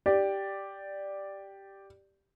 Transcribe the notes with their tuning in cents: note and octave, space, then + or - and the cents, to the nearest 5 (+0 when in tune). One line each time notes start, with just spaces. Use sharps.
G4 +0 D5 +0